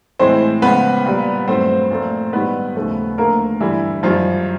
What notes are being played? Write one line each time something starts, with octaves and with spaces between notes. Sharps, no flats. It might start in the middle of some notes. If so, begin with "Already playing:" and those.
A2 E3 G#3 C4 C5
C#2 C#3 F3 B3 B4
A#2 G3
G2 D#3 F#3 A3 C4 C5
A#2 F3 A3
G#2 D#3 G3 B3 B4
D#2 C#3 F3 A3
D2 D3 F3 A3 A#3 A#4
G2 D3 E3 G3 E4
F#2 D#3 F3 G3 F4